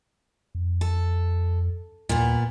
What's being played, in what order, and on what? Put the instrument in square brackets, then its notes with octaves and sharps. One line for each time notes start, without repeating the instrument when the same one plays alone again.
[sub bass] F2
[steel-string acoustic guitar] A4
[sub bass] D#2 [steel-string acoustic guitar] A#2 B3